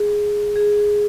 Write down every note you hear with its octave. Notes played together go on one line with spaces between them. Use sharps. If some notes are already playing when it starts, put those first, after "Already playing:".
Already playing: G#4
G#4